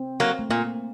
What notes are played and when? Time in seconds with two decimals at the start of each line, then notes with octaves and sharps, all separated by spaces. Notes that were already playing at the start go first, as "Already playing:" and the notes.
Already playing: C4
0.20 F#3 A#3
0.39 A3
0.50 A#2 A#3